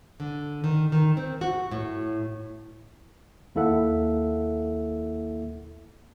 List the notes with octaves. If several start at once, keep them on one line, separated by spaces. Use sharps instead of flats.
D3
D#3
D#3
C4
F#4
A2
D#2 A#3 E4 A4 E5 F#5